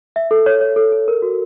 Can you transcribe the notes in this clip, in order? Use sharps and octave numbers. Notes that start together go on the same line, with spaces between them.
E5
A4
C#5
C#5
A4
A4
A#4
F#4